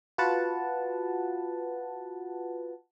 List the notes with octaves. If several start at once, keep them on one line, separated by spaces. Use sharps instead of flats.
F4 F#4 B4 F#5 A5